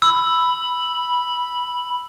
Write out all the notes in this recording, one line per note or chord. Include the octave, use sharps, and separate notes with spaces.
B5 E6